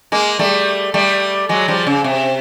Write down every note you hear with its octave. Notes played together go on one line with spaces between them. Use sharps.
G#3 A#3
G3 A3
G3 A3
F#3 G#3
F3 G3
C#3
C3